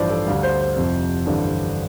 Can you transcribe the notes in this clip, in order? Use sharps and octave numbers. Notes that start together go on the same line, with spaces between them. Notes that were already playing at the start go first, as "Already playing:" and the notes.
Already playing: A1 G2 F3 C5 D5
A4
D2 D3 G3 F5
C5
C5
F1 F2 C3
A1 G2 D3